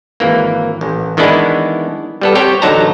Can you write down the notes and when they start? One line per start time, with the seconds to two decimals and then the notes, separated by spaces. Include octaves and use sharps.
0.20 G#1 E3 A#3
0.81 A1
1.17 D#3 E3 G#3 B3 D4 E4
2.21 G3 B3 A4
2.35 C4 G4 C#5 G5
2.62 A1 D3 F#3 D#4 A5 A#5